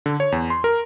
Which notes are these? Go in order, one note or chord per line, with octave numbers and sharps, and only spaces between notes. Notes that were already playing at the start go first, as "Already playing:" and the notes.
D3
C#5
E2
C6
A#4